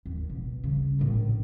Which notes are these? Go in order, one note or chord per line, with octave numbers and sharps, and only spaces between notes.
D#2
B2
C#3 G3
A#1 A2